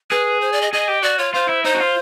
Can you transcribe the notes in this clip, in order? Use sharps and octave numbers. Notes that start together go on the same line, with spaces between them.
G#4 B4
C5
D5
D#5
G#4 D#5
G4
F#4 D5
F4 C#5
F4 C5
E4
D#4 C5
F#4
F4